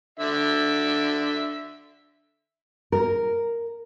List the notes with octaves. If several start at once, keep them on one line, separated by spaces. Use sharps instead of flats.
D3 E5
A#4